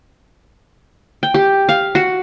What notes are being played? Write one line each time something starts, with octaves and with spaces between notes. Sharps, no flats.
G5
G4
F5
F#4